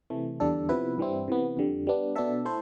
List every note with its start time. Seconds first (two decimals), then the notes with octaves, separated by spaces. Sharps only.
0.10 C3 E3 A3
0.40 E2 D3 G3 D4 A4
0.69 C3 F3 B3 E4 B4
0.98 G2 E3 G3 C4 E4
1.28 C3 E3 B3
1.57 F2 D3 G3
1.87 G3 B3 D4
2.16 B2 B3 D4 A4 E5
2.45 A3 E4 A4 C5